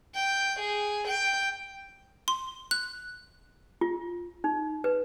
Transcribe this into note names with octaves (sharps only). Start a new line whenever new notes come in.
G5
G#4
G5
C6
F#6
F4
D#4
B4